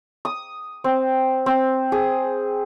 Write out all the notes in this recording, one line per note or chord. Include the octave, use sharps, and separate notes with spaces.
D#6
C4
C4
G#4